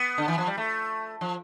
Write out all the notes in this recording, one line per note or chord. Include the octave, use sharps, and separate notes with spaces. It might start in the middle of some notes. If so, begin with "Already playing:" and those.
Already playing: B3
D3
E3
F3
G3
A3
F3